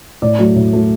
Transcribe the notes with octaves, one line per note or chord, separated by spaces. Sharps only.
A2 D5
F#3 A3
A2
F#3 A3